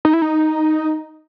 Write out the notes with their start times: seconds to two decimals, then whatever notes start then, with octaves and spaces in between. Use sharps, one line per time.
0.05 D#4
0.13 E4
0.22 D#4